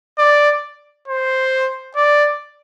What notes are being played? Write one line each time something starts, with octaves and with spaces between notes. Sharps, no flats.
D5
C5
D5